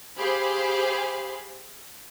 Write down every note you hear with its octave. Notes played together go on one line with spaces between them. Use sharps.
G4 G#4 C5 F5 B5